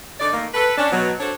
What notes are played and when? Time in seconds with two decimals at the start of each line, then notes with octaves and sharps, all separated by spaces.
0.20 D3 D#4 D5
0.34 D#3 A3 A#3
0.54 A4 B4
0.77 C#4 D4
0.91 B2 F#3
1.20 D4 F#4 A4 C5 C#5